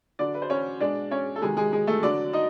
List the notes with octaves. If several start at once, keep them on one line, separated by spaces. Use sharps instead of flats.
D3 F#3 D4 D5
B4
C5
C#4 C#5
B2 G#3 D4 D5
C#4 C#5
A4
C3 D#3 F#3 G#3 G#4
G#3 G#4
G#3 G#4
A3 A4
D3 F#3 D4 D5
D#4 D#5